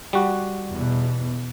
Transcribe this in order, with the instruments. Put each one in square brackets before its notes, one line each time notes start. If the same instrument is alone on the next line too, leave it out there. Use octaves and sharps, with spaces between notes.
[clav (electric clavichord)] G3 F#4
[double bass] E2 B2